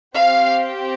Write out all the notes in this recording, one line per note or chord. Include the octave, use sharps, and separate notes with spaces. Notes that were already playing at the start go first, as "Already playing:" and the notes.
C4 G4 F5